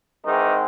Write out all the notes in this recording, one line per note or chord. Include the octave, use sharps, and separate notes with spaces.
G#2 D#3 E3 G#3 C4 D#4